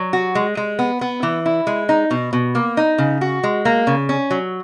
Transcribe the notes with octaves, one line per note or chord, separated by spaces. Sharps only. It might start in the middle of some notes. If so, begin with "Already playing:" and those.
Already playing: F#3
F#4
G#3
G#3
B3
B3
E3
E4
G#3
D#4
B2
B2
A#3
D#4
C#3
F#4
G#3
A#3
C#3
C#4
F#3